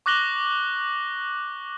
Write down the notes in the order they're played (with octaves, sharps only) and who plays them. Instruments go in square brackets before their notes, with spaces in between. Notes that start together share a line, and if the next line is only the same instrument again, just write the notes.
[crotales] C#6 D6 F#6 A#6 F#7 G7